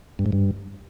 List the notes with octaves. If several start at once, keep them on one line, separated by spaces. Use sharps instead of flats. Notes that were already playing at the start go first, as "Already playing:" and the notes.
G2
G#2
G2